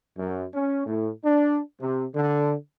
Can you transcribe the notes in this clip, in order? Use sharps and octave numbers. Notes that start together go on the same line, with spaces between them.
F#2
C#4
A2
D4
C3
D3